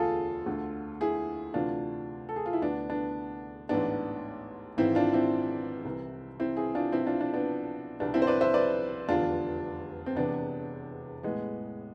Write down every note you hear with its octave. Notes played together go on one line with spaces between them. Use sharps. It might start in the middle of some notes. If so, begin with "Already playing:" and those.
Already playing: E1 D2 D3 F4 G#4 A4
D2 D3
E4 G#4
D2 C3 E3 D4 F4
A4
G#4
F4
E4
D2 D3 B3 D4
B3 D4
A1 G#2 E3 B3 D4
G#1 G#2 E3 C4 E4
D4 F4
C4 E4
C2 C3 E3
C4 E4
E4 G#4
D4 F4
B1 B2 C4 E4
D4 F4
D4 F4
B3 D4
C2 B2 B3 D4
C4 E4
C5
B4 D5
C5 E5
B4 D5
F1 E2 D3 D4 F4
C4
E1 E2 C3 E3 B3 D4
A1 A2 E3 G#3 B3